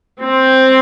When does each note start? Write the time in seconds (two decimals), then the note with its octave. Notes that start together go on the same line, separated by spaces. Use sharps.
0.22 C4